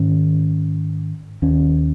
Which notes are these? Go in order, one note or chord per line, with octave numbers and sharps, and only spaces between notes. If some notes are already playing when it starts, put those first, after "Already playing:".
Already playing: G#2 D#3 C#4
D#2 D#3 C#4